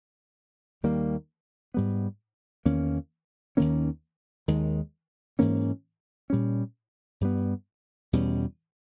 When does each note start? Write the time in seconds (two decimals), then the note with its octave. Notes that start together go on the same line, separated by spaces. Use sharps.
0.83 D#2 D#3 G3 A#3
1.74 G#2 G3 B3
2.65 E2 D#3 A#3 C#4
3.57 D#2 D#3 A#3 C#4
4.48 D#2 D#3 G#3
5.39 G#2 E3 A#3 C#4
6.30 A#2 G3 C#4
7.21 G2 G3 B3
8.13 E2 B2 G3 C#4